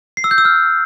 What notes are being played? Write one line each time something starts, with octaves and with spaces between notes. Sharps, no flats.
C7
E6
G6
E6
F6